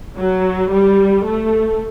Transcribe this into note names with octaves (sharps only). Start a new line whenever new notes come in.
F#3
G3
A3